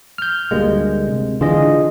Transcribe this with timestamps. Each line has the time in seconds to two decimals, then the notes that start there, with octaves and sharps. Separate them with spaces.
0.18 F6 G6
0.51 D2 G3 G#3 A#3
1.08 C3
1.41 D3 E3 D4 F4 G#4 D#5